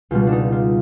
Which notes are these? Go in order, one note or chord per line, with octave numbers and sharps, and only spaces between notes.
C#2 B2 G3 F4
D4
D#4
F4